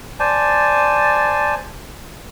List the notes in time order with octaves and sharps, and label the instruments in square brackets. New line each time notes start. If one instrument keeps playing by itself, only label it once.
[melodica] C5 D5 G#5 A5